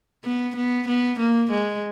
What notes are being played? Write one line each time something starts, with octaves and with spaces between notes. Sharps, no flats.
B3
B3
B3
A#3
G#3